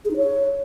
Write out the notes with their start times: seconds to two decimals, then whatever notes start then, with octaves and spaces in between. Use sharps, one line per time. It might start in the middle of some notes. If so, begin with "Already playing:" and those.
0.05 G#4
0.11 D#4
0.17 C#5